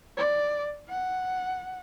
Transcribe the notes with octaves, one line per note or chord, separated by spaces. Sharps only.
D5
F#5